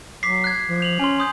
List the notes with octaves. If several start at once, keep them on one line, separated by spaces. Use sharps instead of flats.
F#3 D6 B6 C7
F#6 G#6
F3
G6 F7 F#7
C#4 G#5 C6
C6 D#6 G6